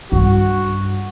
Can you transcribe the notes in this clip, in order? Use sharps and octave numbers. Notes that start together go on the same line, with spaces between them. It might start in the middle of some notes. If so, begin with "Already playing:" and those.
G2 F4 F#4